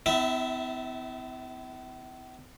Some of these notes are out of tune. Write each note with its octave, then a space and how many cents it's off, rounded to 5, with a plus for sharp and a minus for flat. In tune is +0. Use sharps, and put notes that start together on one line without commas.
B3 +45 E4 -30 E5 +0